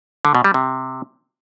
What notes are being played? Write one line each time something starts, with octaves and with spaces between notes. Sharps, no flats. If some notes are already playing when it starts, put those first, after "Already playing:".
D3
B2
G3
C3